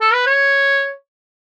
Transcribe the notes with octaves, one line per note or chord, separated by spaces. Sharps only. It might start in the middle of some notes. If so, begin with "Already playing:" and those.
A4
B4
C#5